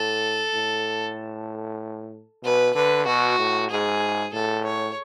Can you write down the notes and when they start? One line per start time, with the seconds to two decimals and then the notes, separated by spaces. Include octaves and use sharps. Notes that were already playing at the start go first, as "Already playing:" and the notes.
Already playing: A2 A4
0.53 A2
2.43 B2 B4
2.75 D3 B4
3.06 B2 F#4
3.39 A2
3.70 G#2 G#4
4.33 A2 A4
4.65 C#5